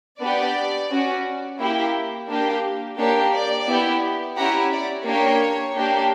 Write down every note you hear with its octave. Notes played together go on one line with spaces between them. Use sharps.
B3 D4 G4 D5
C#4 F#4
A#3 E4 G4
A#3 D4 G4
A#3 D4 G4 C#5
D5
B3 E4 G4
C#4 E4 G4 F#5 A#5
D5
A#3 D4 G4 C#5
A#3 D4 G4